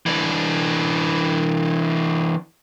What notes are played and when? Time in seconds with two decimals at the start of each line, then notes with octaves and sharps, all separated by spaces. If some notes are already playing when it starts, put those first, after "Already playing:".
0.06 E3 D4